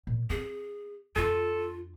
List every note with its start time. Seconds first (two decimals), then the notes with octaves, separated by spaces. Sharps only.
0.07 A#2
0.30 C4 G#4
1.16 F2 D4 F4 A4